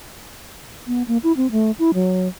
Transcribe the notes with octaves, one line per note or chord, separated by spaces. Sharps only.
B3
A#3
E4
C4
A3
E4
F#3